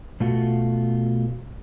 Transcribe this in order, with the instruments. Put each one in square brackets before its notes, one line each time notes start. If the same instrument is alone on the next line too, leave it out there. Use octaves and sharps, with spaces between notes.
[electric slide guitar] B2 A3 F4 F#4